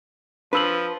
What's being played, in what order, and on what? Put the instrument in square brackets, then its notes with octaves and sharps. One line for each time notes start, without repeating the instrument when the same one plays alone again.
[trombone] F3 [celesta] D4 E6 F#7 [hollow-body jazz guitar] B4